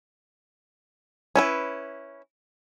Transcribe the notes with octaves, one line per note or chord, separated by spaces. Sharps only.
C#4 E4 B4